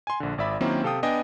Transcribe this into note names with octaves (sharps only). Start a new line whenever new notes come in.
G#5 C6
A#1 D3
G#1 D5 E5 B5
D#3 F#3 A#3 C4 C#4 E4
C3 A4 F5 G5 D#6
B3 D4 D#5 G5 G#5